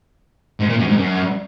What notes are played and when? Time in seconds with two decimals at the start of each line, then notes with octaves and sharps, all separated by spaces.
0.60 G#2
0.69 A#2
0.79 F#2
0.88 G#2
0.98 F#2